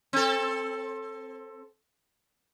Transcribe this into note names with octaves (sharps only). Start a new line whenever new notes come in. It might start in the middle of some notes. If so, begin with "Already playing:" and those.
C4 A4